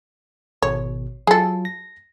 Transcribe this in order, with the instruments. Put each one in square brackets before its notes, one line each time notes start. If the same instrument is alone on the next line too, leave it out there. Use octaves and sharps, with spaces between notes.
[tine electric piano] G#1 B2 [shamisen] C#5
[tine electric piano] F#3 F4 [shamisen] G#4 A4
[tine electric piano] A#6